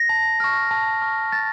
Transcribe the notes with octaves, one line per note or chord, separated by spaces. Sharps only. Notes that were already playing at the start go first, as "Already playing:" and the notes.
Already playing: A#6
A5
C#6 F6
A5
C#6 F6
A5 A6